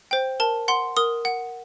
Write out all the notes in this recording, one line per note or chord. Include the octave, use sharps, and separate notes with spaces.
C5 G5
A#4 A5
F#5 C6
A#4 D#6
F#5